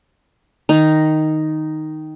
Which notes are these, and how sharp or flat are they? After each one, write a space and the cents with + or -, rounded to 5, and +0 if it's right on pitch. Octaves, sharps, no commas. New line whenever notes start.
D#3 +0 D#4 +0